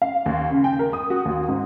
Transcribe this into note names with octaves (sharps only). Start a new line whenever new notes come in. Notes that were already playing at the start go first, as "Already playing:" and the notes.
F5
D#2
C#3
G5
A#4
D#6
F#4
D#2
G#2